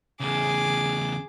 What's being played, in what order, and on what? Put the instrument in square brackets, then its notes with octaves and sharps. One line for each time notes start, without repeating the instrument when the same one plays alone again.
[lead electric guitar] E2 C#3 [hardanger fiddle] G#4 D6